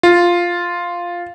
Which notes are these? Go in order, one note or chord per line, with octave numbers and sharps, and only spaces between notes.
F4